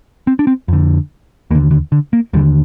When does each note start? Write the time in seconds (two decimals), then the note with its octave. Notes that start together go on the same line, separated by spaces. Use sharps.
0.27 C4
0.39 D4
0.47 C4
0.68 F2 D3
1.51 D#2 A#3
1.55 D3
1.71 D3
1.92 D3
2.13 A#3
2.33 D#2 G3
2.37 D3